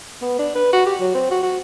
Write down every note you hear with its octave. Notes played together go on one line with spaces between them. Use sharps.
B3
D4
B4
F#4
G4
F#3
C4
F#4
F#4